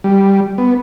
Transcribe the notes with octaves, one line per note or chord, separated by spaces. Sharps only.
G3
B3